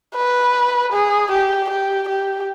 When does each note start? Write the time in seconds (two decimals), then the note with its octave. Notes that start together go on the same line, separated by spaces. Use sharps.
0.17 B4
0.93 G#4
1.32 G4
1.70 G4
2.09 G4